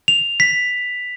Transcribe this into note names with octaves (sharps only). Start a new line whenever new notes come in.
F7
B6